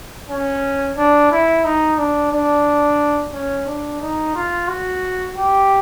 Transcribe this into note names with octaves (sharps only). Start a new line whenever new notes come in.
C#4
D4
E4
D#4
D4
D4
C#4
D4
D#4
F4
F#4
G4